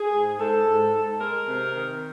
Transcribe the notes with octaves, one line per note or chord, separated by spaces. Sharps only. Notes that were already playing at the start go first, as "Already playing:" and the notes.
Already playing: G#4
G#2
G#2 A4
G#2
G#2
G#3 A#4
C3
D#3